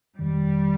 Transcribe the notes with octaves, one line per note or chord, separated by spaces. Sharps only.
G1 F2 D#3 G3